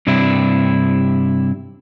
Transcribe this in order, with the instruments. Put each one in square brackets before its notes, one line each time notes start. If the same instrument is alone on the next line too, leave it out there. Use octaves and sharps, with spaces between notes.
[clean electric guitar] G2 C3 D4 E4